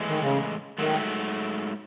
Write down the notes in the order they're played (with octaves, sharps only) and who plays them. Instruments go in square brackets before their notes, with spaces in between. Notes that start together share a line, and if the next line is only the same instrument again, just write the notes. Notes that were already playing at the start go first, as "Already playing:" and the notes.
Already playing: [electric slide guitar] A2 E3 G#3
[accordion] D#3
C#3
[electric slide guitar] G#2 F#3 A3 [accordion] D#3